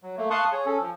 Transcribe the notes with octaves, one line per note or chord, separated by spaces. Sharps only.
F#3
A3 A#3
F5 A5 C6 C#6 D#6 F#6
G#4 C#5
C#4 A4
F3